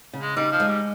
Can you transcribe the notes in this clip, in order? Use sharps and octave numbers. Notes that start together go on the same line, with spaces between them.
C#3
G#3
G3 D#4
F3
G#3
G3